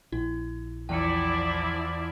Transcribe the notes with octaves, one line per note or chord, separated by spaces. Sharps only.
A#1 E4
E2 F3 E4 D5 G5 C#7